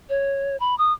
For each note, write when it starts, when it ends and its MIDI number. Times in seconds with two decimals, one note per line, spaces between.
0.09 0.57 73
0.60 0.75 83
0.78 0.93 87